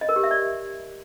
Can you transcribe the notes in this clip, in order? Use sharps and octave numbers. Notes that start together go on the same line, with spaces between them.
D#5
A#4
G4
E5
D5